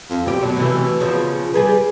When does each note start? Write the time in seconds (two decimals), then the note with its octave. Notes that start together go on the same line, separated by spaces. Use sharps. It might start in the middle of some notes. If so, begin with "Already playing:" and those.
0.10 F2
0.26 D2 B2 G4
0.42 B2 F#3
0.57 C3 E3 A3
1.00 C#3 F3
1.54 G3 G#4 B4